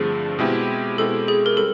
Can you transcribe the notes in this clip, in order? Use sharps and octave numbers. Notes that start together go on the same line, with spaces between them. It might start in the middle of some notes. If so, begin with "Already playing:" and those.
Already playing: G2 D3 F3 A3 C4 G#4
B2 G#3 C4 E4 G4
B2 G#3 C4 E4 G4 A4
G#4
A#4
G3 C4 A4